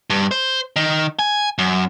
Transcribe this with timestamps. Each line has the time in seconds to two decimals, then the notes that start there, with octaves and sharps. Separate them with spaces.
0.10 G2
0.31 C5
0.76 D#3
1.19 G#5
1.58 F#2